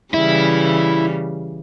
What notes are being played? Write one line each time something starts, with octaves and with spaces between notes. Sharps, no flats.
C#3 E3 G3 E4